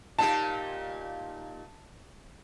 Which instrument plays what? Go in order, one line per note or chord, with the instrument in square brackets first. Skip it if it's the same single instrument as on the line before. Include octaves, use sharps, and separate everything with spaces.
[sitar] A#2 D#4 G4 [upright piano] A5